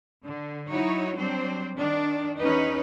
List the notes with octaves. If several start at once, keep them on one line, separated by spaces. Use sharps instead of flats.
D3
F#3 D#4 E4 F#4 C#5
F#3 G3 C4 D4 C5
D#3 D4
E2 C#4 D#4 B4